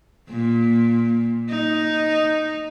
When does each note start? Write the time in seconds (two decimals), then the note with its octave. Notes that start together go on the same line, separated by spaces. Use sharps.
0.29 A#2
1.50 D#4